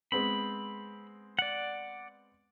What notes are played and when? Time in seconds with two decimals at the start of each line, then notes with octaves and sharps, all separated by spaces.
0.12 G#3 B3 C4 B5
1.39 D5 F#5